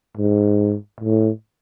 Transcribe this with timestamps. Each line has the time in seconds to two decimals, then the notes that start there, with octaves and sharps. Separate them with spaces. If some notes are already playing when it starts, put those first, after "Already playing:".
0.17 G#2
1.00 A2